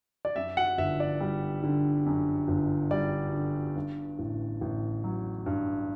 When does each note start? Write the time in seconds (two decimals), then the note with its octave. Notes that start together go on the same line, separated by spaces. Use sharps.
0.25 D5
0.36 F#2 E5
0.57 F#5
0.78 G1 E5
1.00 D5
1.20 G3
1.63 D3
2.06 F#2
2.48 G1
2.91 G3 D5
3.34 D3
3.76 G2
4.19 A1
4.61 A1
5.04 F#3
5.46 G2